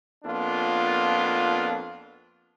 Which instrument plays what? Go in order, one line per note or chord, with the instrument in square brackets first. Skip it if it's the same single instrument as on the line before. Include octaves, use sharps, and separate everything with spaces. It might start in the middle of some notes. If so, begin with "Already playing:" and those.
[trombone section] F2 A#3 B3 D4 F4